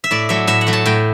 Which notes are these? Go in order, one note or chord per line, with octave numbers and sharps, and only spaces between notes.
E5
A2 D5
F#3 A3 E5
A2 E5
F#5
F#3 A3
A5
A2 G5